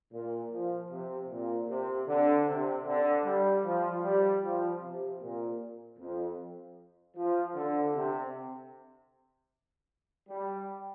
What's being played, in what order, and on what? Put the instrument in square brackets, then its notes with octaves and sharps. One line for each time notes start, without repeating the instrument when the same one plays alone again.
[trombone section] A#2
F3
C3
A#2
C3
D3
C3
D3
G3
F3
G3
F3
C3
A#2
F2
F3
D3
C3
G3